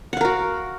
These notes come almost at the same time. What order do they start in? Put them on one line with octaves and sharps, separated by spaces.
F#5 F5 A#4 F#4